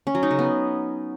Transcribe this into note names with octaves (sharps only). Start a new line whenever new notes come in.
C#4
F#3
D#4
C#3
B3